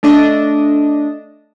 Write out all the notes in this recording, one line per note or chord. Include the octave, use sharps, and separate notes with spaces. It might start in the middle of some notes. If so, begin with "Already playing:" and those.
A3 D4 D#5